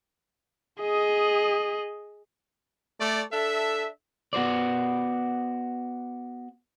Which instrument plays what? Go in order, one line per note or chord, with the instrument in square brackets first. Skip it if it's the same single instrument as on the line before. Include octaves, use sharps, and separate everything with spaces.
[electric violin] G#4 D#5
[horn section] A3 D5
D4 A4 E5
[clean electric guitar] B3 F#4 C5 D5